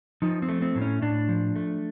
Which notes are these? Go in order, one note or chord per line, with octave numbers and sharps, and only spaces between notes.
F3 D#4
C4
A3
C4
A2
C#4
A2 D4
F3
A3